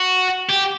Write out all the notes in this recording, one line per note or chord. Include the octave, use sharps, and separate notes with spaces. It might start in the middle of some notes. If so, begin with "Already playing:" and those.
Already playing: F#4
G4